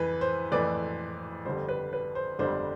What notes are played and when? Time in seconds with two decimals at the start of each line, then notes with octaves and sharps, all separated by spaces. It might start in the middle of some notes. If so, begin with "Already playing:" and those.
Already playing: F2 E3 B4
0.21 C5
0.52 F2 E3 A3 B4 D5
1.45 G1 F2 D3 G3 D4 C5
1.69 B4
1.93 B4
2.15 C5
2.39 G1 F2 D3 G3 D4 C5